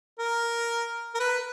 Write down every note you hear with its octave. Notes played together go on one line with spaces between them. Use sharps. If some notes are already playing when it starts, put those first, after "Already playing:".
A#4
A#4
B4